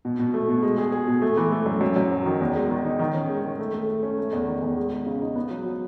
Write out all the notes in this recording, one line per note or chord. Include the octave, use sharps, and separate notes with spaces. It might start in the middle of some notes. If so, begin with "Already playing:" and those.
B2
B2
A3
B2
G#3
G#4
G#4
B2
A3
E3
A3
F#2
F#2
F#2
F#3
D#3
E2
G#3
D#3
D#4
D#3
C#4
G#3
D#3
A3
A3
A3
C#4
A3
E2
D#3
E2
G#3
G#3
C#3
D#4
B3
F#3
F#3